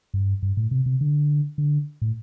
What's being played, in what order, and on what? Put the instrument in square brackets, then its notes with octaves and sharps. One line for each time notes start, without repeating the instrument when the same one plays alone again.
[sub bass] G2
G2
A2
C3
C3
D3
D3
A2